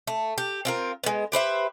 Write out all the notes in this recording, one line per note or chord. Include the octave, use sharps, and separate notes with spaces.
A3
G4
C4 F4 A#4
G#3 B3
G4 B4 C5 E5